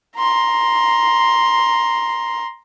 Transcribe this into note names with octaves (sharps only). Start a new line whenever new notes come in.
A#5 C6